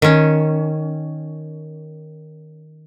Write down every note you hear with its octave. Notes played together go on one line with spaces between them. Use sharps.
D#3 C#4